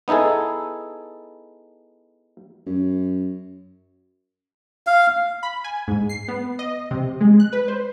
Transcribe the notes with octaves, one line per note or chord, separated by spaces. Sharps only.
B3 D#4 E4 G#4 A4
F#2
F5
B5
G#5
G#2
C7
B3
D#5
C3
G#3
F#6
B4
C5